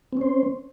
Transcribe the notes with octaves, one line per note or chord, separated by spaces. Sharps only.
C4 C#4 C5